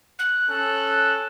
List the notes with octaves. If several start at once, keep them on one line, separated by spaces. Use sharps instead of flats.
F#6
C#4 A4